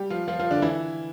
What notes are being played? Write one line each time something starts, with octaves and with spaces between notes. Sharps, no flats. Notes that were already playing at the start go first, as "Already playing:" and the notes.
Already playing: G3 G4
F3 F4
F3 F4
F3 F4
D3 D4
E3 E4